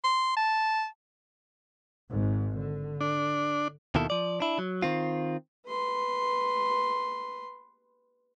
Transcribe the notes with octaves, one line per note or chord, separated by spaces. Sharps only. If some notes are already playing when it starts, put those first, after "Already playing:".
C6
A5
G#1 G#2
D3
D4
D#2 B2 D#3 E4 A4
F3 D5
D4 E4
F#3
D#3 C4 F4
B4 C6